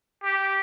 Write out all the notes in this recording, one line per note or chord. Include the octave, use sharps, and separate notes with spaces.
G4